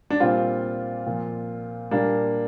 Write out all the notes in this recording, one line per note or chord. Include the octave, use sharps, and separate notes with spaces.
D4
A#2 G3 C4 F4
A#2 F3
A#2 G3 A#3 D4